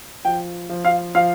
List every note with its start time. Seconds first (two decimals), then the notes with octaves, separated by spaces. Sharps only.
0.25 F3 G5
0.69 F3
0.85 F5
1.15 F3 F5